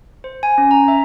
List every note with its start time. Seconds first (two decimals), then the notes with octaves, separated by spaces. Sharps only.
0.24 C5
0.43 G#5
0.58 C#4
0.71 A#5
0.88 E5